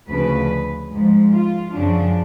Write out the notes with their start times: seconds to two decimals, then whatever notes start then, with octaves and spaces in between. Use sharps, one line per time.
0.08 D2 C#3 F3 B4
0.92 G#2 F3
1.33 F4
1.74 F#2 C#3 F3 D4